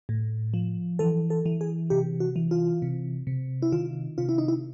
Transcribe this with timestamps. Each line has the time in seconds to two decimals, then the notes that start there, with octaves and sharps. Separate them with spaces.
0.09 A2
0.54 F3
0.99 E3 A4
1.30 A4
1.46 E3
1.61 G#4
1.90 C3 G4
2.20 F#4
2.36 E3
2.51 F4
2.82 C3
3.27 C3
3.62 E4
3.72 D#3 F4
4.18 C3 F4
4.29 E4
4.38 D#4
4.48 E4